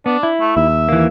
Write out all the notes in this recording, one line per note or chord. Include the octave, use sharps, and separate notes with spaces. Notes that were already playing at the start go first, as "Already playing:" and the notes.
B3 D4
E4
A3
D#2 E5
E3 A#3